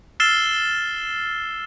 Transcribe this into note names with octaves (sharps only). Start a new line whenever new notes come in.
E6 F6 A6 C7 E7 G7